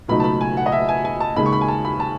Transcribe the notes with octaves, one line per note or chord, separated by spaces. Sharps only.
C#2 B2 F#3 A3 D#4 B5
A5
B5
G#5
F#5
D#5
E5
G#5
G#5
A5
D#2 C#3 G#3 B5
C#6
B5
G#5
A5
B5
A5